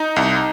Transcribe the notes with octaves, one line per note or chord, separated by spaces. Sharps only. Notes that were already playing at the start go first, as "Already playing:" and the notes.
Already playing: D#4
C2